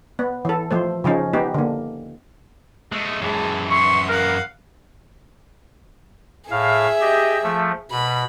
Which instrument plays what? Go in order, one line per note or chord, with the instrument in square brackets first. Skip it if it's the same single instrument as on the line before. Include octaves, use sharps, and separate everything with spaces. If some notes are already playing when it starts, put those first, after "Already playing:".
[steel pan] B3
E3 A4
F3 A3 C5
C#3 F3 C#4 D#4
B3 D#4 G4
D3 A#3
[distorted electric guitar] G#3 A3 [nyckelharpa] D#5
[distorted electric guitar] F#2 E3 [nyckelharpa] G#3 A5
[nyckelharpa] E5 C6 [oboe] C#6
[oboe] A#4 [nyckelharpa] F5 F#5
[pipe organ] A2 F5 [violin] G#4 E5
[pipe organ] G4 D#5
F3 A3
[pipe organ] B2 [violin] B5